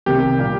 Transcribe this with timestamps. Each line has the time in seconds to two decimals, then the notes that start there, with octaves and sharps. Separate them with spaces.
0.06 C2 C3 D#3 G4
0.38 A#2 G3 A#3